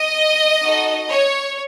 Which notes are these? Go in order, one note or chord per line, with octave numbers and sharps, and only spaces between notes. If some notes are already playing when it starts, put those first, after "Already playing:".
Already playing: D#5
D#4 F#4 A4
C#5